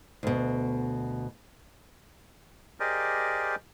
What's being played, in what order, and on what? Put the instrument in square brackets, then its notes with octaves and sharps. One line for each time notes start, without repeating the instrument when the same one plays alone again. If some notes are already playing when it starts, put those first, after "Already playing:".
[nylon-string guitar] D2 B2
[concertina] G4 G#4 A#4 C5 D5 D#5